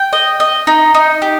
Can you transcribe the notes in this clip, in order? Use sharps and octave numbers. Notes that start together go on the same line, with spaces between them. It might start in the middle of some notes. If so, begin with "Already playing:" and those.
Already playing: G5
D#5
D#5
D#4
D#4
G4